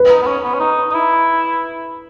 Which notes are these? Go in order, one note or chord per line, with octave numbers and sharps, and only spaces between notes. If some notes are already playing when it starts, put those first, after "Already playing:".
Already playing: B4
D#4
B3
C#4
B3
C#4
D#4
D#4
E4